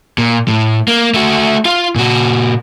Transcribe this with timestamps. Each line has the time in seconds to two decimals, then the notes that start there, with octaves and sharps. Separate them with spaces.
0.18 A#2
0.48 A2
0.88 A#3
1.14 A3 F#4
1.65 F4 F5
1.96 A#2 F#4